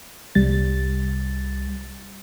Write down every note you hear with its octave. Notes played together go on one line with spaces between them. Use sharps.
C2 G3 A6